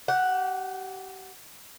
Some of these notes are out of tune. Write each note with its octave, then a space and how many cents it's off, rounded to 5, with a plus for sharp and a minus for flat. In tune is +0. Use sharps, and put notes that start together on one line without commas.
G4 -30 F#5 +0